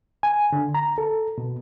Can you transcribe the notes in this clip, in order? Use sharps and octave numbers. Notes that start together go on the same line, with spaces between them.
G#5
D3
A#5
A4
B2